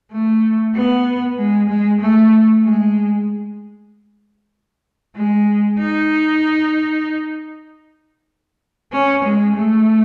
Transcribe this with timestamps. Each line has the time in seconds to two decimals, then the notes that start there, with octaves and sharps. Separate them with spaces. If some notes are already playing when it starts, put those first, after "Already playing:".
0.12 A3
0.75 B3
1.38 G#3
1.69 G#3
2.00 A3
2.64 G#3
5.15 G#3
5.78 D#4
8.92 C#4
9.24 G#3
9.55 A3